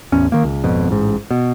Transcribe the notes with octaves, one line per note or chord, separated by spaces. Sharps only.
A1 E2 C#4
D#3 A#3
C#2
G#1 F2 B2
A1 G#2
B2